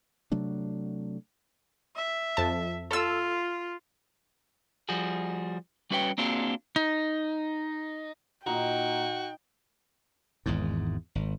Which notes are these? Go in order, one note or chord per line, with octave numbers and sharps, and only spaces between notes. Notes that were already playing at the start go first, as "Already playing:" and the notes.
C3 F#3 A3 D4
E5
F2 A5
F4 A4 E6
F3 G3 F#4 G#4
G3 C#4 F#4 B4 C#5 G5
A#3 C4 D4 F4 F#4 G#4
D#4
A#2 D#4 F#4 G5 A#5
G#1 E2 G#2
G#1